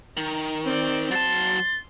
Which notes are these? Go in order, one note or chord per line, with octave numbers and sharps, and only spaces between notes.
D#3 A#5
C4 D5
F#3 A5 C6 A6